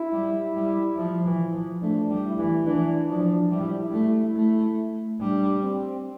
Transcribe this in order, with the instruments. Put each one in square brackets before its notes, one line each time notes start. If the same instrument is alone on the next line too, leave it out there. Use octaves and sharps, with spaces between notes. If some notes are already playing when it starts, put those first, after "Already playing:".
Already playing: [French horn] E4
[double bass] G3
G3
F3
E3
F3
[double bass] A3 [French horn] D4
[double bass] G3
[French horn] E4
[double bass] E3
[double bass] E3 [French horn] D4
[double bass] F3 [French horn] D4
[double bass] G3 [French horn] E4
[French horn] E4
[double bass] A3
[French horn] E4
[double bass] A3
[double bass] G3 [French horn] D4
[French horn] C4